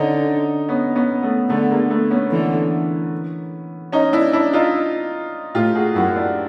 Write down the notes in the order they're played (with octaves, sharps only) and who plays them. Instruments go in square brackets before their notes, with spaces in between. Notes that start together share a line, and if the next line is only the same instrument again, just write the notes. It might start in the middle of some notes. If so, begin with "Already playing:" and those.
Already playing: [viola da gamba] D3 [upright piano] C#4 D#4
[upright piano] B3 C#4
B3 C#4
A3 B3
[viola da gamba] D3 [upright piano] A3 B3
[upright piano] G#3 A#3
A3 B3
B3 C#4
[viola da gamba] D3 E3
[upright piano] C#4 D#4
D4 E4
D4 E4
D#4 F4
[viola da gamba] A2 [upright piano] F4 G4
[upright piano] F#4 G#4
[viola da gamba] F#2 [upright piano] E4 F#4
[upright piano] D4 E4